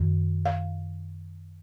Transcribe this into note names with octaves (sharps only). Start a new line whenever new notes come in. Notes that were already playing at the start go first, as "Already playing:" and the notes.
Already playing: F#2 D#3
F5